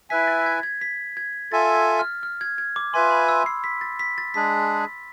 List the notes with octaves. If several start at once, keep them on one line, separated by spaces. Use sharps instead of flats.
E4 B4 E5 G#5 B6
A6
G#6
G#6
B6
G#6
F4 A4 E5 G#5 A6
A6
F6
F6
G#6
G#6
D6
F4 B4 E5 G#5 C6
B5
E6
C7
B6
A6
B6
A6
G#3 D4 G#4 B6